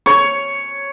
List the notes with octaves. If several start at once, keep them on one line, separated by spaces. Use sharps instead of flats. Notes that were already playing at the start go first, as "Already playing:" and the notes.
C#5